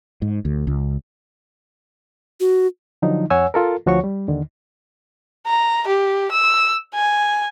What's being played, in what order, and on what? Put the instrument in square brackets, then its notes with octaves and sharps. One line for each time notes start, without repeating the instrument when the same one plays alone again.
[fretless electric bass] G#2
D2
C#2
[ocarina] F#4
[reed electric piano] D3 F3 F#3 D#4
F2 C#5 F#5 G#5 E6
F4 A4 A#4
D2 F3 F#4 C#5 C#6
G3
D#2 D3 D#3
[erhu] A#5
G4
E6
G#5